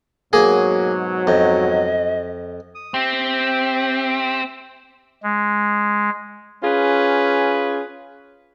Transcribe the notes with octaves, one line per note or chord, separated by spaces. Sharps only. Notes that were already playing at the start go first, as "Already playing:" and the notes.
G#2 B2 F#3 A#3 G#4
F2 D#5
D#6
C4 G4 E5 G5
G#3
C#4 F4 G#4 B4